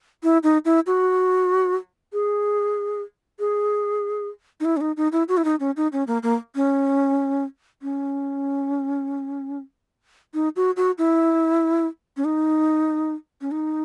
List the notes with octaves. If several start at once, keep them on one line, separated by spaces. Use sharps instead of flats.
E4
D#4
E4
F#4
G#4
G#4
D#4
E4
C#4
D#4
D#4
E4
F#4
E4
D#4
C#4
D#4
C#4
A#3
A#3
C#4
C#4
D#4
F#4
F#4
E4
C#4
D#4
C#4
D#4